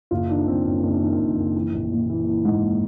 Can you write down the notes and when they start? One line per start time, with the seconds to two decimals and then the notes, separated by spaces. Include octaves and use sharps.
0.11 F#1 F4
0.29 D#3 D4
0.47 F#1 C4
0.65 F#1 C#4
0.83 F#1 D4
1.02 D#3
1.19 F#1 D#4
1.37 F#1
1.55 E3
1.73 A#1
1.91 A#1
2.09 E3
2.27 E3
2.45 G#2